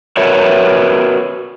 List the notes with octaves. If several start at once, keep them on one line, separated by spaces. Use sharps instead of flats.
F#4 A#4 B4 C#5 E5